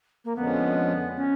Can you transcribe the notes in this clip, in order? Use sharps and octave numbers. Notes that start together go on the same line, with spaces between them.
A#3
F2 D3 F3 G#3 B3 C#4
C#4